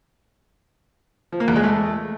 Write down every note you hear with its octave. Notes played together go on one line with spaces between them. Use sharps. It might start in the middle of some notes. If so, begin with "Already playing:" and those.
F3
A#3
E2
G#3
A3